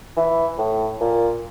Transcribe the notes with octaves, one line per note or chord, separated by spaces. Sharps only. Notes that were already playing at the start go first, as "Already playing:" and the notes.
E3
A2
A#2